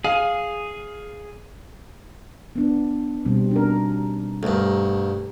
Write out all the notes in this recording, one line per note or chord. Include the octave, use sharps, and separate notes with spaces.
G#4 F5
B3 D4
B2 G3 C4
D4 D#4 A#4
D2 G2 A4 A#4